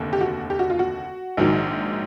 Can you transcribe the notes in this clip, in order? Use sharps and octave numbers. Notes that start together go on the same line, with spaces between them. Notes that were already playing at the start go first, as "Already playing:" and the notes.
Already playing: F1 D#2 D3
G4
F#4
G4
F#4
F4
F#4
A#1 G#2 D#3 F#3